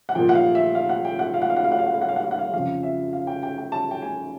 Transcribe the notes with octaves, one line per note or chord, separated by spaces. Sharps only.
F#5
A#2 F3 G5
F#5
F5
E5
F5
F#5
G5
F#5
F5
F#5
F5
F#5
F5
F#5
F5
F#5
F5
F#5
F5
F#5
F5
F#5
F5
F2 C#3 F3 F5
E5
F5
G5
G5
G5
A5
G5
G#5